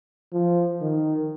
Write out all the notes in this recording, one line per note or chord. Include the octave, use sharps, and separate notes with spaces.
F3
D#3